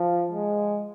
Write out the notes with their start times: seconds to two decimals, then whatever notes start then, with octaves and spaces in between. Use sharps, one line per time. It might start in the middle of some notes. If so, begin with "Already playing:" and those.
Already playing: F3
0.32 G#3